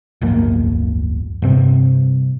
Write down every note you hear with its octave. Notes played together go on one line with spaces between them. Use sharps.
D1 G1 F2 A#3
G2 C3 C4